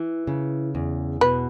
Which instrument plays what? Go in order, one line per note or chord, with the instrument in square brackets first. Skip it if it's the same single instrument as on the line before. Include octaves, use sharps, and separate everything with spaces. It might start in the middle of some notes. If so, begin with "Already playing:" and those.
Already playing: [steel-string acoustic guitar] E3
C#3
E2
[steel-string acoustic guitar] B2 [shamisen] B4